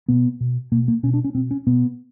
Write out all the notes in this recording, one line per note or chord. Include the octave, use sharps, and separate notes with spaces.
B2 B3
B2
B2 A#3
A#3
B2 C#4
D4
C#4
B2 C4
C#4
B2 B3